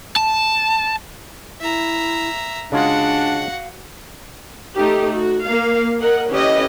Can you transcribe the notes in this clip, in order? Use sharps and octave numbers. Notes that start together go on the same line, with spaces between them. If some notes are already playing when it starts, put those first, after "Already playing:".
A5
E4 E5 A#5
C#3 G#3 D4 F4 F#4 F5 F#5
A3 D#4 G4
F#4
A#3 F5
A#4 D#5 F#5
D3 C#4 E4 G4 B4 D#5